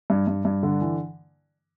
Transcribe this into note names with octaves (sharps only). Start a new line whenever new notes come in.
G2
G2
G2
D3
E3